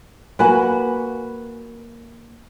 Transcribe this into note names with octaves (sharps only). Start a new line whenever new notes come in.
A#3 F#4 B4 G#5 B5